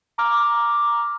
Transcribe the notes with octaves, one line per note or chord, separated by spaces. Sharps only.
A#5 D6 F6